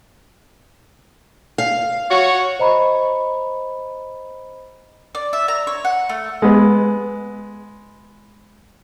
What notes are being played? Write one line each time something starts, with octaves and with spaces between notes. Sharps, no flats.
F5
F#4 C#5
C5 D#5 A#5 B5
D5
E5
A#5
C#5
F#5
A3
G#3 B3